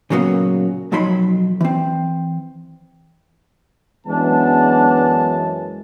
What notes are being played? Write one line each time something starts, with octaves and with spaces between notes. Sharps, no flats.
A#2 C#3 F#3 A#3 B3
B1 F2 F#3 D#4 B5 C6
E3 C4
F#2 E3 G#3 B3 D4 A5